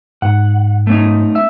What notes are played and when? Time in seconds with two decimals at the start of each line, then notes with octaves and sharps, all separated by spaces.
0.22 G#2 F#5
0.87 A3 C#4 D#4
1.35 E5 E6